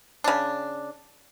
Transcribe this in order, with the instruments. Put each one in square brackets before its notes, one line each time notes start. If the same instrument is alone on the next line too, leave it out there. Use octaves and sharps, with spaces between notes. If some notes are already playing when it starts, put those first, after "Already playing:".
[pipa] C#3 D4